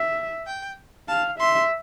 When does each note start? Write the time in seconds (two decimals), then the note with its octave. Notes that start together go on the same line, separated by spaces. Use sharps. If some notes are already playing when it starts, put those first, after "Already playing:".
Already playing: E5
0.47 G5
1.08 F5 A5
1.39 E5 C6